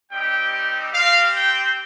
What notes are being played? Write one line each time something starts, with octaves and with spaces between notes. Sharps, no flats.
G3 C4 D#4 G4 G5
C4 G4 F5
G5